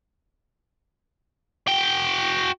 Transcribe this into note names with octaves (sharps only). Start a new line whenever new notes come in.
F#4 G5